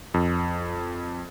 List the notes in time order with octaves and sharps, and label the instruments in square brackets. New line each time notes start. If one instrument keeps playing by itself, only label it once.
[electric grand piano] F2